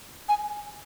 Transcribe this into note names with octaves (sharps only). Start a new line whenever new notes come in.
G#5